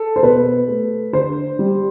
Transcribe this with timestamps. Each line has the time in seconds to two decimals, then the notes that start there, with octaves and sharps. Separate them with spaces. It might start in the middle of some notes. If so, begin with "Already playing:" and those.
Already playing: A4
0.16 C5
0.23 B2 B4
0.68 A3
1.13 D3 C5
1.59 G3